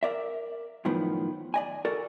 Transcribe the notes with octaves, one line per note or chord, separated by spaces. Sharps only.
A#4 D5 E5
F#2 A2 D#3 F3 B3
D5 D#5 G#5
F#4 A4 A#4 D5